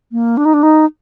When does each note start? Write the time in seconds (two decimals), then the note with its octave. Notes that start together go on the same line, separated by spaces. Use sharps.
0.12 A#3
0.37 D4
0.45 D#4
0.54 D4
0.63 D#4